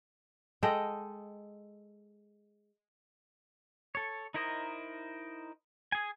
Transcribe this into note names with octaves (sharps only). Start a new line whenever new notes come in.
G#3 A4 D#5 G5
A4 C#5
D#4 E4 A#4 C5 D#5
G#4 G#5